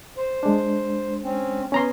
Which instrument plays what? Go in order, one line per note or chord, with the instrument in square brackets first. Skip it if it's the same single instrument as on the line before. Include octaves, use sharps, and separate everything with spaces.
[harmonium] C5
[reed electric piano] G#3 D4
[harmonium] C4 C#4
[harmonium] B3 G#5 [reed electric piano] C#4 A#5 C6